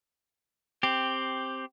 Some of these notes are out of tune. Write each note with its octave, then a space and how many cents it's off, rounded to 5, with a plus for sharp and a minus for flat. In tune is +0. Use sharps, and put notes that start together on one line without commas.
C4 +5 G4 +0